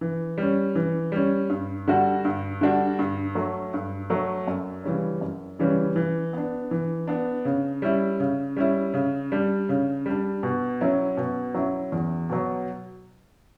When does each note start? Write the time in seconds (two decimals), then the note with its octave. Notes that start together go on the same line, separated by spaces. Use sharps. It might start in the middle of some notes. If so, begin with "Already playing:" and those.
0.01 E3
0.38 G3 C#4
0.75 E3
1.12 G3 C#4
1.50 G2
1.88 D3 G3 D4 F#4
2.25 G2
2.61 D3 G3 D4 F#4
2.99 G2
3.35 F#3 A3
3.74 G2
4.10 F#3 A3
4.47 F#2
4.84 C#3 E3 G3 C#4
5.21 F#2
5.59 C#3 E3 G3 C#4
5.96 E3
6.33 B3 D4
6.71 E3
7.07 B3 D4
7.45 C#3
7.82 G3 C#4 E4
8.20 C#3
8.56 G3 C#4 E4
8.94 C#3
9.32 G3 D4
9.69 C#3
10.06 G3 D4
10.43 B2
10.81 F#3 C#4 E4
11.17 B2
11.54 F#3 C#4 E4
11.92 E2
12.30 B2 F#3